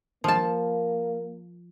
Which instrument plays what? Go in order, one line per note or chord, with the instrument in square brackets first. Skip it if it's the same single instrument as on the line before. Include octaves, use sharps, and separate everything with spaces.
[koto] F3 A5 [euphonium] A#3